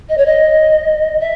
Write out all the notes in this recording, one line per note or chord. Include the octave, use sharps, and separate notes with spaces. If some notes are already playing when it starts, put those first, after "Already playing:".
D#5
C#5
D#5
E5